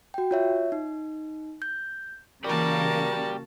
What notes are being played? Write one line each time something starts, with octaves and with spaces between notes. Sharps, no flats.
F#4 G5
F4 C#5 E5
D#4
G6
C#3 E3 A#3 F#4 G4 A#4 D5 A5